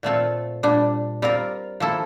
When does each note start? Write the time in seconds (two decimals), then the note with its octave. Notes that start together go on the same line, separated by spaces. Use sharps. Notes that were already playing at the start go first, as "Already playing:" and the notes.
0.03 A#2 A3 C4 F4 A4
0.63 A#2 G3 D4
1.22 G3 C4 F4 A#4
1.80 F3 A#3 E4 A4